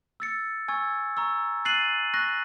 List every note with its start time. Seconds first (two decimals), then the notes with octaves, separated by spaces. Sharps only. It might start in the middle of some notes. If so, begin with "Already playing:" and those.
0.20 E6 A6 C#7
0.68 G#5 C#6 E6 G#6
1.17 A#5 C#6 E6
1.65 F#6 A6 C7 D#7 F#7
2.14 C#6 F#6 A#6